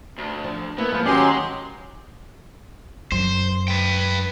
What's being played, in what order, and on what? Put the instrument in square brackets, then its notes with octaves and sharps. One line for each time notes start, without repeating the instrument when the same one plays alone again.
[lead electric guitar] D2
[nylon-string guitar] F3
[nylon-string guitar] A#3 [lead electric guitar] B3 [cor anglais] E4
[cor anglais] F3 [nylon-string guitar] G#3
[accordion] D#3 F#3 C6 [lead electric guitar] G#3 [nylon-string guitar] C#4 G#5 [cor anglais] G4
[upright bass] F#2 [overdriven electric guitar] C5
[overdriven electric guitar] B4 G5